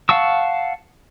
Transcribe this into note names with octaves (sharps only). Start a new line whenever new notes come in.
F5 F#5 A5 C#6 E6